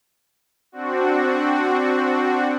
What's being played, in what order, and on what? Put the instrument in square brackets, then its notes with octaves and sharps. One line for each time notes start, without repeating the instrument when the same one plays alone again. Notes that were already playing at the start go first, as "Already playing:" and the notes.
[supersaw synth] C4 D4 F#4